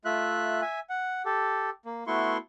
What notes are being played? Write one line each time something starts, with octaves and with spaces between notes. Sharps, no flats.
A3 F4 E5 F#6
E5 G#5
F#5
G4 A4
A#3
A3 B3 E4 F#4 C6 C#6